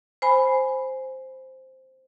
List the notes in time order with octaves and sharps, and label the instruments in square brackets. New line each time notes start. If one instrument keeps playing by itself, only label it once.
[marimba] C5 G#5 B5